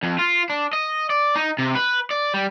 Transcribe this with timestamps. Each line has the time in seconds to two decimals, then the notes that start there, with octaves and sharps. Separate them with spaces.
0.03 F2
0.19 F4
0.50 D4
0.73 D#5
1.10 D5
1.36 D#4
1.58 C3
1.75 B4
2.10 D5
2.34 G3